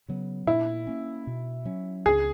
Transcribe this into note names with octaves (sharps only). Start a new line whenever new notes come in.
C#3 F#3 B3
A#2 E4
A#3 C#4
B2
F#3 C#4
C#2 G#4